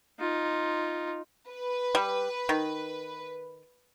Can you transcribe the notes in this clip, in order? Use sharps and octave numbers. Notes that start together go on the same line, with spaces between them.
D#4 F4
B4
G3
D#3